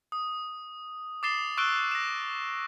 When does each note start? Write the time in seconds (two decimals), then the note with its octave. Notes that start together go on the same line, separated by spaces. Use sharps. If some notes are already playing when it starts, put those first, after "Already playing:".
0.12 D#6
1.23 D6 D#6 A6 C7 E7 G7
1.57 C#6 E6 F#6 D7 G7
1.92 A#6 E7